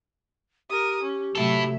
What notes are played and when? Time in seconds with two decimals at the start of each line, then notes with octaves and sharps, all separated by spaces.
0.70 G4 A#4 D#6
1.03 C#4
1.36 C3 F#3 A3 E4 A4 E5